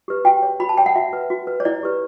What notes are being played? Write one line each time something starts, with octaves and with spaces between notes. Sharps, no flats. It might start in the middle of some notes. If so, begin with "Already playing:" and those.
G4 B4
F#4 G5
C#5
F#4 B5
A5
C#5 G5
F#5
F#4 E5
B4
F#4
B4
C#5
E4 D5
G4 B4